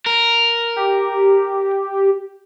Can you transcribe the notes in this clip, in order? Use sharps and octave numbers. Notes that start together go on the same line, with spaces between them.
A#4
G4